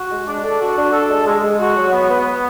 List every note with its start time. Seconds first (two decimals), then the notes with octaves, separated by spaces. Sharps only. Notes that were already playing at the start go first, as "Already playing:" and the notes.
Already playing: F#4
0.10 G#3
0.27 D4
0.43 A4
0.60 F#4
0.76 D4
0.93 A4
1.09 G#3
1.26 G#3
1.42 G#3
1.59 F#4
1.76 F#3
1.92 B3
2.08 B3
2.25 B3